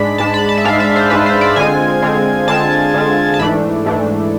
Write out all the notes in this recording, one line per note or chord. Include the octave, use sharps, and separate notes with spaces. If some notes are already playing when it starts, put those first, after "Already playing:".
Already playing: G#2 G#3 D4 B5
G#2 G#3 D4 A5
B5
A5
E5
G#2 G#3 D4 F5
E5
C5
G#2 G#3 D4 B4
C5
D5
D3 G#3 C4 F4 G#5
D3 G#3 C4 F4
D3 G#3 C4 F4 A5
D3 G#3 C4 F4
A5
G#2 E3 A3 D4 B5
G#2 E3 A3 D4